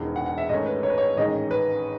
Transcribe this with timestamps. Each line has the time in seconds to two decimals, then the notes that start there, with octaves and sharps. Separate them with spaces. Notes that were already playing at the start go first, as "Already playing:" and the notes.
Already playing: E1 E2 D#3
0.16 F#5
0.26 F#5
0.38 E5
0.49 G#2 D#3 A3 C#4 D#5
0.66 B4
0.83 C#5
0.90 B4
0.98 C#5
1.17 A1 G#2 D#3 G#3 C#4 D#5
1.51 B4